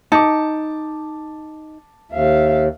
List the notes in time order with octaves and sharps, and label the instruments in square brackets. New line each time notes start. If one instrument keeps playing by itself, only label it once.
[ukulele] D#4 [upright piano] A5 D6
[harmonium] D#2 [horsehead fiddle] E5 F5